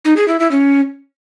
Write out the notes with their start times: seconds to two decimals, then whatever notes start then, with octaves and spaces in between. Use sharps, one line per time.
0.05 D#4
0.16 G#4
0.28 E4
0.40 E4
0.51 C#4